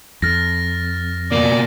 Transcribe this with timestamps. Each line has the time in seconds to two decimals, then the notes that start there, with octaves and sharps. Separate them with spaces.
0.22 F2 F6 A6 A#6
1.32 B2 A#3 D5